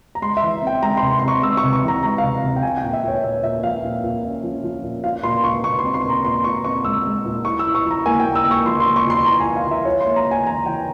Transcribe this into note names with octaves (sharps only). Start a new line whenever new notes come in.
A#5
G#3 C6
E5
E3
C4
G5
G#3 A#5
C6
C3
C6
C3
C#6
G#3 E6
C#6
C3
C#6
E3
A#5
G#3 A#5
C3 F5
C3 F5
G5
F3 G#5
G5
A#2
E5
A#2 C#5
A#2 E5
A#2 E5
F3 F5
A#2
A#2
C#4
F3
F3
A#2
F4 F5
A#2 C6
A#2 C#6
A#2 C#6
C6
C4
C6
A#2
A#5
A#2 C6
F4 C#6
C4 C#6
G#3 E6
G#3
A#2
E4 C#6
E6
E4
C#6
F3
A#5
A#3 G#5
G5
A#3
E6
A#3
C#6
F3 C6
C6
A#3
C#6
F3 C6
E4 A#5
G#5
F3
F5
F3
E5
F4 C#5
C6
A#3
A#5
A#3
G#5
E3 A#5
E3 G5